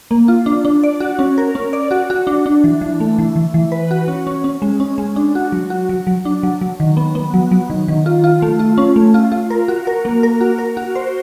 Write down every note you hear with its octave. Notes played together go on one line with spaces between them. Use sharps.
A#3
F4
D4
D4
D5
F#4
C#4
A#4
C#4
D5
F#4
F#4
D4
D4
E3
E3
A3
E3
E3
E3
B4
F#4
C#4
C#4
C#4
G#3
C#4
G#3
D4
F#4
F#3
F#4
F#3
F#3
D4
F#3
F#3
D#3
B3
B3
F#3
F#3
D#3
D#3
F4
F4
A3
F4
C#4
A3
F4
F4
A#4
F#4
A#4
A#3
A#4
F#4
A#4
F#4
C5